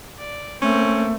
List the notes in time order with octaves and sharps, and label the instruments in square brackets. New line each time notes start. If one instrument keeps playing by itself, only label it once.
[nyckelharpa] D5
[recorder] A3 [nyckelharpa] A#3 C4 [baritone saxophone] C#4